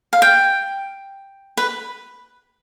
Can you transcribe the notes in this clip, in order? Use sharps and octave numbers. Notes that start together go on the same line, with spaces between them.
F5
G5
B4